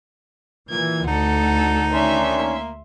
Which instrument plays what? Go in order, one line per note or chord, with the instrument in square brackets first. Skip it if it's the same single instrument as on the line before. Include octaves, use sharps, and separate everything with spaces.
[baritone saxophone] A#2 [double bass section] E3 [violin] G#6
[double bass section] D2 [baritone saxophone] D#4 [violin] A4 F#5
[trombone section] D#3 C#4 D4 [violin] E5 C6
[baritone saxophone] A#3